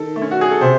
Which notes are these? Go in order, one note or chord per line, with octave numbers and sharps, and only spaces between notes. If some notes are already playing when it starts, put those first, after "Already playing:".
Already playing: D#3 A4
A3
C#4
F#4
G#4
A4
C3 C5